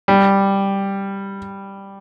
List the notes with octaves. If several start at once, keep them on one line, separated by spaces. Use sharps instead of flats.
G3